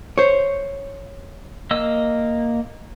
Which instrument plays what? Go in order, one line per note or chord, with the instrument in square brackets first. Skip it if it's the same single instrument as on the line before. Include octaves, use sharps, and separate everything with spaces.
[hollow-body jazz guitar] C5 C#5
[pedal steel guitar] A#3 D#5 E6